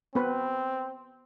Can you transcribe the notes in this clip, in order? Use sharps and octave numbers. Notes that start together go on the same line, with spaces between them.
B3 C4 B4 B5